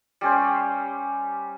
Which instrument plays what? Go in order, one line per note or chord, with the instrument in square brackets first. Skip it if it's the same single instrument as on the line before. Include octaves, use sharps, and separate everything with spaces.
[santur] G3 C#4 C5